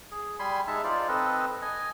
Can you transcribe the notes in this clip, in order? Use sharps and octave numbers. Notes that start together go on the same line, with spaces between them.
G#4
G3 G#5 B5 C6
G#3 D#4 E5 A5
D#4 F4 C5 D5
C4 A4 B4 D#5
D#5 G#5